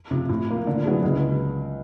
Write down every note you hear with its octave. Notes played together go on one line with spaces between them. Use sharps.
C3 F3
A2
F3 A#3
D3
F#3 B3 E4 G#4
C#2